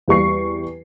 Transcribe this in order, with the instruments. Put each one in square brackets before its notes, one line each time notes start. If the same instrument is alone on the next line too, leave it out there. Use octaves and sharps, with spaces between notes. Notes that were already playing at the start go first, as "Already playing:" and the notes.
[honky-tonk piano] E2 G3 C#6 C7